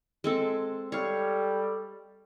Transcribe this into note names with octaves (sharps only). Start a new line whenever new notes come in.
G#3 C4 A4
G3 A4 C#5 F5